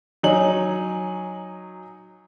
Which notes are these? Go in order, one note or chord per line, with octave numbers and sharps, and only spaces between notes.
F#3 D#4 C#5 G#5 F#7